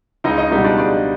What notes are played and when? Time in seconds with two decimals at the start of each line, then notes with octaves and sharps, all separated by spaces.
0.24 C#2 D#4 D#5
0.38 D#4 D#5
0.51 B2 G3 D#4 D#5
0.64 D4 D5
0.78 C#2 D4 D5